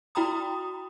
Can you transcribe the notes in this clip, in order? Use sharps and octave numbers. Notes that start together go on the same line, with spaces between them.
E4 F#4 G5 A#5 B5 D#6